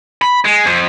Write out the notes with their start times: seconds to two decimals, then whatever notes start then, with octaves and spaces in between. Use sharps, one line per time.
0.22 B5
0.45 G#3
0.66 F2